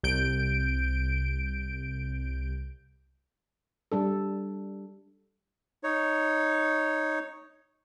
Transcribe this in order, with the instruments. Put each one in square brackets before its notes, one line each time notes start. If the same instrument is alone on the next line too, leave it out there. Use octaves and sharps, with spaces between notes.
[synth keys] C2 G6 D7
[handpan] G3 D4 A4
[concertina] D#4 C#5